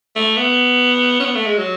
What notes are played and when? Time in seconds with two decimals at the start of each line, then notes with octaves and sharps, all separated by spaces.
0.16 A3
0.37 B3
1.20 C#4
1.25 B3
1.35 A3
1.46 G#3
1.58 F#3